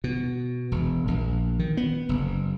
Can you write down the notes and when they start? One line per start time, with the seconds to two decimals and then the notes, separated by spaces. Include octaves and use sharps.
0.04 B2
0.72 E1
1.08 A#1
1.59 D#3
1.77 B3
2.09 F#1